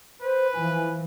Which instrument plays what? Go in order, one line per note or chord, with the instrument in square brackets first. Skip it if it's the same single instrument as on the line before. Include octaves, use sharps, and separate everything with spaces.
[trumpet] B4 [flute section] C5
[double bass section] E3 F3 [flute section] G#5